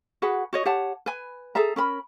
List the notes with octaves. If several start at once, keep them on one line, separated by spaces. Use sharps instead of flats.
F#4 G#4 B4 F#5
F#4 C#5 D#5
G4 C#5 F#5 A5
B4 G#5
G#4 A4 E5 A#5
C#4 A#4 B5